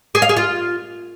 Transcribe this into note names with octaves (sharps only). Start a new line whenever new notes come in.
G#4
F5
G#4
F4